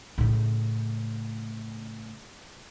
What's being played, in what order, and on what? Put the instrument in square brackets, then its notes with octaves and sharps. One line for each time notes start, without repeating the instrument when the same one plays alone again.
[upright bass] A2 C#3